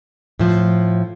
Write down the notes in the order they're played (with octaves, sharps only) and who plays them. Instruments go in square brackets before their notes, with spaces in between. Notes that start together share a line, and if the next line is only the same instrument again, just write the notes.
[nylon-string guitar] A2 F3